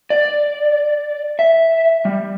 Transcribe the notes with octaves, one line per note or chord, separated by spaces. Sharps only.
D5
E5
G3